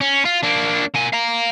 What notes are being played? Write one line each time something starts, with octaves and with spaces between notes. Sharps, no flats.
C#4
F4
A#3 D4
A#3 G#5
F5 A#5